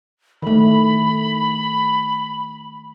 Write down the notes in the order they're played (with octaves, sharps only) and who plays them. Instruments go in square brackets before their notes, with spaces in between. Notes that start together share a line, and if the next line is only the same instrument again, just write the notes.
[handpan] D#3 A3 [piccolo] B5